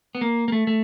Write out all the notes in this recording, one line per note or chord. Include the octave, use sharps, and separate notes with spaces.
B3
A#3
A#3
A3
A3